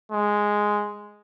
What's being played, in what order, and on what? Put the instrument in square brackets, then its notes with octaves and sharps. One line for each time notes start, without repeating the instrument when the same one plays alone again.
[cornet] G#3